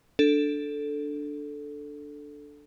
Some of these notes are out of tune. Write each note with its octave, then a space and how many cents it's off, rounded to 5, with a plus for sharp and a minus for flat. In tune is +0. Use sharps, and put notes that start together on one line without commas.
D4 +0 A4 +0